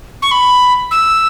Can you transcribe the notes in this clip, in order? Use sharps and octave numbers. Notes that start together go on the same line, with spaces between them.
C#6
B5
E6